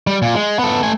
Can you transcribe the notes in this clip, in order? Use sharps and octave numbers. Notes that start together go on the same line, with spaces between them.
G3
A#2
G#3
B3 A4
A3 G#5